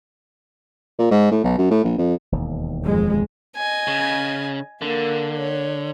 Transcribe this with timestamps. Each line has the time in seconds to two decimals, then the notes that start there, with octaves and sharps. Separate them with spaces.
0.99 A#2
1.11 G#2
1.32 A2
1.44 B1
1.58 F#2
1.71 A2
1.84 A#1
1.98 F2
2.32 E1 D#2
2.84 F2 G#3
3.56 D#5 G#5
3.87 C#3
4.82 D3 A#3
5.38 C#5